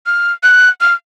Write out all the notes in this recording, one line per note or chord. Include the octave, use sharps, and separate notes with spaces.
F6
F#6
F6